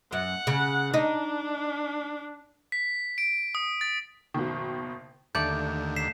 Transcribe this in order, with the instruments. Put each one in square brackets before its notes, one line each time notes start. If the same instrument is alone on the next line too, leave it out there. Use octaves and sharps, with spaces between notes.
[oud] F#2 [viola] F#5
[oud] C#3
[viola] D4 [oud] D#4
[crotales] B6
D7
D#6
A6
[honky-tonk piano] F#1 B2 D#3
[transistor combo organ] D#2 D3 [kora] A3 D5 [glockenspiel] G6
[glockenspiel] B6 C7 E7